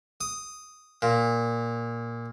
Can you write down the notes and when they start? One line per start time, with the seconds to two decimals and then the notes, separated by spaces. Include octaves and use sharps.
0.21 D#6
1.02 A#2